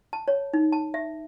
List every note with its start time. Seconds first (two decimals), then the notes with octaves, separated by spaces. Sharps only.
0.13 A5
0.28 C#5
0.53 D#4
0.72 A5
0.94 E5